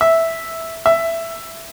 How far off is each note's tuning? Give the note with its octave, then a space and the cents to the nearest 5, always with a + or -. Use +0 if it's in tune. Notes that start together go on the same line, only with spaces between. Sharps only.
E5 -5
E5 +10